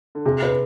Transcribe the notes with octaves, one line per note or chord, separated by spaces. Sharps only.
D3
C3 G#4
B4